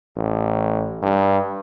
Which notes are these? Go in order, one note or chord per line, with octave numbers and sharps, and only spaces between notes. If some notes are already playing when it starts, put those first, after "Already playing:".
A1
G2